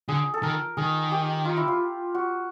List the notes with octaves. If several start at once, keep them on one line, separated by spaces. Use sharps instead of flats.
D3 G#4
A4
D#3 A#4
D#3 G#4
G4
F4
E4
F4
F#4